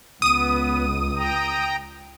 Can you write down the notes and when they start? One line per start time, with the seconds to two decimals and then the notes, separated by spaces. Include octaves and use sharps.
0.22 C#2 B3 D#6 D#7
1.16 G5 A#5